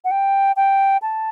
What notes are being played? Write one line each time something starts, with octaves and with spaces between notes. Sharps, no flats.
F#5
G5
G5
A5